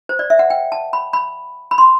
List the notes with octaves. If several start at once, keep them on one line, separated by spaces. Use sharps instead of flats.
C5
D5
E5
F#5
G5
A5
B5
B5
B5
C6